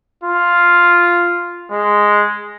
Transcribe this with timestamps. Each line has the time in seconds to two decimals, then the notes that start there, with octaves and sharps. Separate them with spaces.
0.24 F4
1.71 G#3